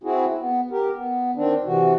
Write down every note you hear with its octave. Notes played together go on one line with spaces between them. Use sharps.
C4 E4 F#4 G#4
B3
G4 A#4
B3
D#3 C4 D4
C3 E3 F#4